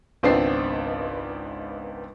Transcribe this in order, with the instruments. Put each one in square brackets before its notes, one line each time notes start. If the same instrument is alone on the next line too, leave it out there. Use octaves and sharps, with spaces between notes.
[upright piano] G#1 C#2 B3 C4 D4 C7